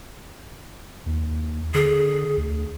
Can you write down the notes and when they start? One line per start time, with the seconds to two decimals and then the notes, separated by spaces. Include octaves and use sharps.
1.06 D#2
1.74 D3 G#4
2.37 D2